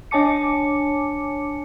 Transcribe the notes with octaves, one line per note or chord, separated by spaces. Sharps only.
D4 C#5 G#5 A5 D6 C#7